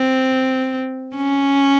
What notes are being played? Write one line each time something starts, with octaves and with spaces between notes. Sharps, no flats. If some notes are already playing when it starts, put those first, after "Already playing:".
Already playing: C4
C#4